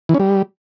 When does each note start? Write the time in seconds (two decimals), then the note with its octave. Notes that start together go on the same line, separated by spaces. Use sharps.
0.09 E3
0.14 C#4
0.20 G3